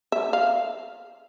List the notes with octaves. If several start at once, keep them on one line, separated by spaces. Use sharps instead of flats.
E5
F5